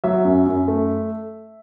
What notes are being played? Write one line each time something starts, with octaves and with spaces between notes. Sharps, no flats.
F#3 E5
F#2
F#2
A3